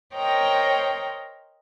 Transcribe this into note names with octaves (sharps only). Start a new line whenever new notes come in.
A#4 C5 C#5 D#5 G5 A#5